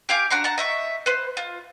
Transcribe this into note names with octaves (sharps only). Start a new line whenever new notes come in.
G4 F5 G#5 D6
D4 F#4 A#5 C6
F#5 A5 A#5
D#5 E5 C#6
B4 C5
F4